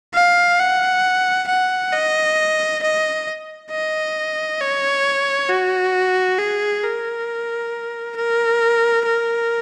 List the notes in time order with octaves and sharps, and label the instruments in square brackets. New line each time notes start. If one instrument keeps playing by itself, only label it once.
[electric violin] F5
F#5
F#5
D#5
D#5
D#5
C#5
F#4
G#4
A#4
A#4
A#4